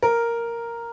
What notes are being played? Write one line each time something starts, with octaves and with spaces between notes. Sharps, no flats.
A#4